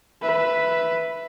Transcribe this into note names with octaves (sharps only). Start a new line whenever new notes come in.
B4 E5